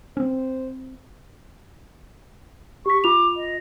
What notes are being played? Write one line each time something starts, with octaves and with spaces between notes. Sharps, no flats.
C4 C#4 C5
G4 C#6 B6
F4 D6 F7
D#5